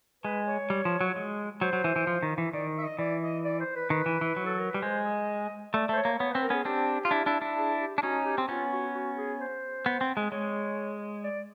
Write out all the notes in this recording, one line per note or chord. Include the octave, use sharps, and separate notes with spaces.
G#3 B4
C#5
G3
F3
F#3
G#3
F#3 C5
F#3
E3
E3
F3
D#3
E3
D#3 D5
E5
D#5
E3 D5
D#5
D5
C5
B4
D#3 B4
E3
E3
F#3
A4
A#4
G3 B4
G#3 C5
D#5
A3 D5
A3 C5
C#5
A#3
B3 C#5
B4
C4
A#4
B3 C#4 G#4
C4 D4 G4
F4
D4 E4
D4 E4
D4 E4
G#4
G4
D4
C#4 D#4 F#4
G4
C4
B3 C#4 F4
F#4
F#4
G#4
C5
B3
C4
G#3
G#3 C#5
D5